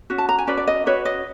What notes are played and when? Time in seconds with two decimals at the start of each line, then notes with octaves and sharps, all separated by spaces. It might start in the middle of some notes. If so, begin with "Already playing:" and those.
0.10 C#4 F#4
0.18 A5
0.29 A#5
0.38 G#5
0.47 C#4 F#4 B4 D5
0.57 D5
0.67 D#5
0.86 C#4 F#4 B4 C#5
1.05 D#5